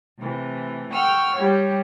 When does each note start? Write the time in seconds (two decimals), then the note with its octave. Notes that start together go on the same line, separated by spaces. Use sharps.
0.21 C3 E3 A3
0.93 F#5 G5 C#6 E6 F6
1.36 G3 G4 C#5